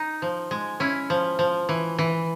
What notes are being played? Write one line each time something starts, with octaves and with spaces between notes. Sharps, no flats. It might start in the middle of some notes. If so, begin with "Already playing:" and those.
Already playing: D#4
F3
G#3
C#4 E4
F3
F3
E3
E3